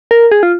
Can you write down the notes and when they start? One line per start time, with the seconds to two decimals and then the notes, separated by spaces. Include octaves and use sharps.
0.11 A#4
0.31 G#4
0.43 F4